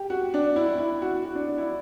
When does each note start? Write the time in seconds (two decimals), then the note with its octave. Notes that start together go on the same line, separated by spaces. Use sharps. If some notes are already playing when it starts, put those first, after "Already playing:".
Already playing: G4
0.10 F#4
0.34 D4
0.56 E4
0.78 E4
1.02 F#4
1.25 F#4
1.35 D4
1.48 D4
1.58 E4